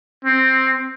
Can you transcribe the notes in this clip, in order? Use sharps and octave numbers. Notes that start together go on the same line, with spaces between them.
C4